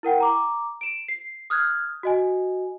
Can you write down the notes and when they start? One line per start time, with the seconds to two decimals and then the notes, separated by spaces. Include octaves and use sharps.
0.03 E4 A#4 F#5 G5
0.20 A#5 D6
0.81 D7 E7
1.08 C7
1.50 D#6 F6 F#6 G#6
2.03 F#4 D#5 G#5